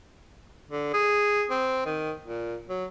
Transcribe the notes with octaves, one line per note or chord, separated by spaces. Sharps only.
D3
G#4
C4
D#3
A#2
F#3